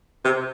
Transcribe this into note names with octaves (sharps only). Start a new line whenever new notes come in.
C3